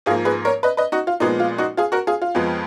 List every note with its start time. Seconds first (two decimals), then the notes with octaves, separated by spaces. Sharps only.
0.06 G#2 F3 A#3 F4 G#4
0.25 G#4 B4
0.45 A#4 C#5
0.63 B4 D#5
0.77 B4 D#5
0.92 D#4 F#4
1.07 F4
1.20 A#2 F3 G#3 B3 D#4
1.40 F4
1.58 D#4 F#4
1.77 F4 G#4
1.92 F#4 A#4
2.07 F4 G#4
2.22 F4
2.35 F2 F3 G#3 B3